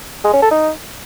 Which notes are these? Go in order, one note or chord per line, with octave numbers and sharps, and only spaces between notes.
G#3
C#4
A4
D#4